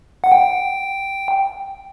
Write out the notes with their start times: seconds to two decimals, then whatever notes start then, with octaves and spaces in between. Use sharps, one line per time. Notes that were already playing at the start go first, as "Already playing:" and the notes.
0.24 F#5
0.32 G5